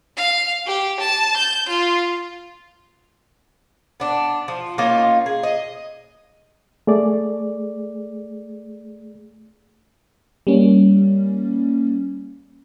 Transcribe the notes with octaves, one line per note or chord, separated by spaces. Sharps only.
F5
G4
A5
G6
F4
B3 D4
F3
A#3 C#4 D#4 F4
G#4
D#5
A3 G#4 D5
G3 A#3 C#4